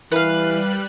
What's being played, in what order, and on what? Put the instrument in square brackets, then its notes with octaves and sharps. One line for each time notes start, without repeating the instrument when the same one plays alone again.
[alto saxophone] E3 [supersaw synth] G3 F#6 [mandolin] B4 F5